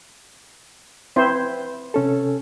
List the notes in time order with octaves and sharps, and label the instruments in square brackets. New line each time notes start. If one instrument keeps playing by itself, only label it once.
[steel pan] C4 E4 C5 [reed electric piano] B4
[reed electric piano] C3 C#4 A4